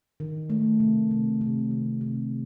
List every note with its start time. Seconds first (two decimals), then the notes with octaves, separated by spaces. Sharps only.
0.20 D#3
0.50 A3
0.80 C3
1.11 C3
1.41 C3
1.71 D#3
2.01 C3